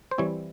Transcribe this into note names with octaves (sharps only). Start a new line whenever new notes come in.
C5
E3 G3 C4 E4 C#5